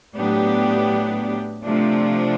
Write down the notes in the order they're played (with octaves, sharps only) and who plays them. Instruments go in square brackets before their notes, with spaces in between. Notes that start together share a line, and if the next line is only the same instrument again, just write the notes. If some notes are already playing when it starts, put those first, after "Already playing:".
[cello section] A2 F#3 B3 D4 G4
C3 F3 A3 D4